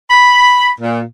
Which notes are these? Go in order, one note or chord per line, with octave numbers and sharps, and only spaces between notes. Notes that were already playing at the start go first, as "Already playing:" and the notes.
B5
A#2